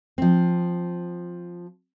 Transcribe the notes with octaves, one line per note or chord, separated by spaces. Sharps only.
F3 C4